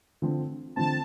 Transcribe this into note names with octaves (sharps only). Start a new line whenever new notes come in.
D3 F3 C4
D3 F3 C4 A5